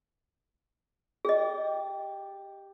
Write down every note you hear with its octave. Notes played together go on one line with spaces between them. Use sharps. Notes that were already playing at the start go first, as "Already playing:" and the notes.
G4 G#4 D#5 G5